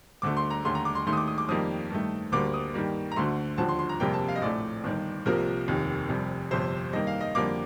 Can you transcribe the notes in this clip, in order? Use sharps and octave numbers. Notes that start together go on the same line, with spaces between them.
D2 D3 A3 D6
C6
A#5
D#2 D3 A3 C6
A#5
D6
C6
D#2 D#3 A3 C6
D#6
D6
D#6
D6
F2 D#3 G3 A#3 D#6
G2 D#3 A3
D2 D3 G3 A#3 D6
D#6
G2 D#3 G3 A#3
A#5
D2 D3 A3 C6
D#2 D3 F3 A5
C6
C6
A#5
F1 F2 C3 G3 A#3 G5
A5
F5
D#5
A#1 A2 A3 D5
G1 G2 D#3
C2 C3 F3 A#3 A#4
F1 D#2 D#3
F1 F2 C3 G3
G1 F2 C3 C5
G2 D#3 A#3 D#5
F5
D#5
F2 D3 G3 A#3 D6